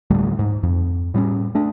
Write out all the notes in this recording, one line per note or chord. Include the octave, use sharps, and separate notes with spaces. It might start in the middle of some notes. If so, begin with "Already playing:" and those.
D2 A2 G3 A3
G#2
F2
A2 G3 C4 C#4
A3 D4